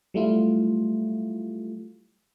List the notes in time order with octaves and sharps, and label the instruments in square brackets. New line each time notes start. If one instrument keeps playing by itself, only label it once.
[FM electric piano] F#3 G3 A3 E4 F4